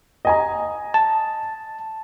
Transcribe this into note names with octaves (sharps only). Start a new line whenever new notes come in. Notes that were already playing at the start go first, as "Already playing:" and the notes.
D#5 G#5 A#5
A5